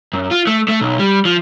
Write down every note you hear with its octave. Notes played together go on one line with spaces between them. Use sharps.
F#2
F4
A3
A3
B1
G3
F3